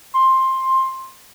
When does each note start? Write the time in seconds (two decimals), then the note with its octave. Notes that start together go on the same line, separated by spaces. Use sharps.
0.14 C6